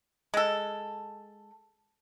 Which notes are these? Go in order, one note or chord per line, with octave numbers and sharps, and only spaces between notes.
G#3 A4